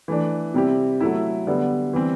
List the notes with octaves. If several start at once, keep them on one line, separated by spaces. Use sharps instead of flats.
E3 A3 D4
C3 G3 C4 E4 G4
F#3 A3 E4
D3 G3 B3
E3 G3 C4